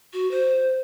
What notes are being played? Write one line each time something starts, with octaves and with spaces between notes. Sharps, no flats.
F#4
C5